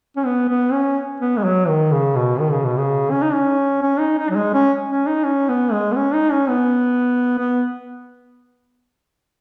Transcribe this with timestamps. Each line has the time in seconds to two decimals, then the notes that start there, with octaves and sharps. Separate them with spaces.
0.17 C#4
0.26 B3
0.49 B3
0.72 C#4
1.21 B3
1.37 G#3
1.44 F#3
1.68 D#3
1.92 C#3
2.15 B2
2.40 D#3
2.52 C#3
2.64 B2
2.78 C#3
3.11 C#4
3.22 D#4
3.34 C#4
3.82 C#4
3.99 D#4
4.18 D#4
4.30 F#3
4.36 G#3
4.54 C#4
4.89 C#4
5.07 D#4
5.25 C#4
5.49 B3
5.72 G#3
5.92 B3
5.96 C#4
6.14 D#4
6.32 C#4
6.49 B3
7.39 B3